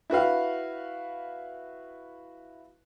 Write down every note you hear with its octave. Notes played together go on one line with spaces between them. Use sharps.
E4 F#4 B4 F5